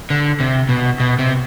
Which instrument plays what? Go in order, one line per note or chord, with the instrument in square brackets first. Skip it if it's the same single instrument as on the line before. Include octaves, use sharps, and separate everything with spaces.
[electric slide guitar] D3
C3
B2
B2
C3